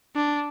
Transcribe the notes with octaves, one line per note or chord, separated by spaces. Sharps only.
D4